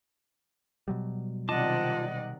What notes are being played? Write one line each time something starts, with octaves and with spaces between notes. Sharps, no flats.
B2 F#3 G3
C3 D#3 F4 D5 D#5 F#5 A5 D6